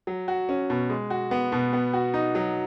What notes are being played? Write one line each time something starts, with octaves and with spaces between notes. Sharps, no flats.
F#3
F#4
C#4
B2
G#3
F#4
B3
B2
B3
F#4
D#4
F#3